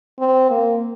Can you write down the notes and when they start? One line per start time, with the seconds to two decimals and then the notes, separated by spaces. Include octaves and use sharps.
0.19 C4
0.49 A#3